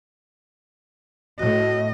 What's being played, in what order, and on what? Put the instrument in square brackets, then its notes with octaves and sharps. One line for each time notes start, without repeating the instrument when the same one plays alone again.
[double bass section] A2 [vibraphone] F#4 [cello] D#5